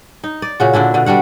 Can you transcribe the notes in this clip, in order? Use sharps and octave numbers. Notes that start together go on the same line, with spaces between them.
D#4
D5
A#2 C#3 F#4
A#2 D3 D4 E4
B2 D3
G3 D4 F#4 F#5